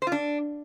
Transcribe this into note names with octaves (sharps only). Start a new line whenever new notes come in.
C5
F4
D4